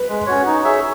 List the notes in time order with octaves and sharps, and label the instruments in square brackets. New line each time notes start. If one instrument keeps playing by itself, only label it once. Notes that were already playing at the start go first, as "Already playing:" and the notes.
Already playing: [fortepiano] B4
[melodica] G#3
C#4 F#4 C#5
D#4
G#4 C#5 E5